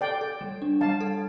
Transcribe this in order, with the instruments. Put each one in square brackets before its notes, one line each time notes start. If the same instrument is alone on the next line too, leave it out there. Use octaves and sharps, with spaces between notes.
[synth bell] A4 [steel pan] D5 G5
[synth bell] A4
G3
D4
[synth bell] G3 [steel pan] F5 A5
[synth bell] A4